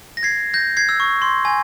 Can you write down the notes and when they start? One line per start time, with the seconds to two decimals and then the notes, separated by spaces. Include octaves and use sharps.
0.17 A#6
0.23 G#6 C7
0.53 G6 A#6
0.77 G#6 C7
0.89 E6
1.00 C#6
1.22 C6
1.45 G#5